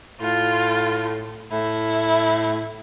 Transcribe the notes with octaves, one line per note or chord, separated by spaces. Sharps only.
A2 F4
A2 E4